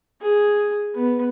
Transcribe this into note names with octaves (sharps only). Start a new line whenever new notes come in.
G#4
B3